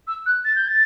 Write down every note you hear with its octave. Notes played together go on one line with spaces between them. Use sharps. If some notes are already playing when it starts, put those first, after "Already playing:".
E6
F#6
A6
G6
A6